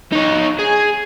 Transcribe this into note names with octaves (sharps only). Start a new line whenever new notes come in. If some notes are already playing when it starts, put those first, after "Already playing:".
D#4 C#5
G#4